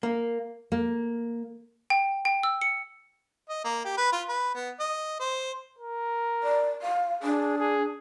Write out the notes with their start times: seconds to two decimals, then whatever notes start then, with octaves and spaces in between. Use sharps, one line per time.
0.03 A#3
0.72 A#3
1.90 G5
2.25 G5
2.43 E6
2.61 C#7
3.50 D#5
3.64 A#3
3.85 G4
3.97 B4
4.13 F4
4.29 B4
4.55 B3
4.80 D#5
5.20 C5
5.79 A#4
6.43 D5
6.82 F5
7.23 D4 G#4
7.58 G#4